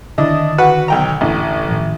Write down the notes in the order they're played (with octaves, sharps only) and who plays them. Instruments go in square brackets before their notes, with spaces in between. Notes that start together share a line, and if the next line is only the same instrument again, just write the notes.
[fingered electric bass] D3 D#3 [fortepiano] D4 E4 D#5
[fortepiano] F#4 B4 F#5
B1 G5 A#5
[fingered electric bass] E1 D3 D4 [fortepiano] A1
[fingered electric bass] A2 D#3 F3